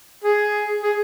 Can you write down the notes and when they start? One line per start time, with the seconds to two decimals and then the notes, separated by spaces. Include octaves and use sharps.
0.24 G#4
0.83 G#4